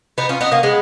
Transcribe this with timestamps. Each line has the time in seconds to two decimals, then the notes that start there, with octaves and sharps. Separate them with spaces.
0.18 B3 D#4
0.29 C#4 F4
0.41 B3 D#4
0.52 A#3 C#4
0.63 G#3 B3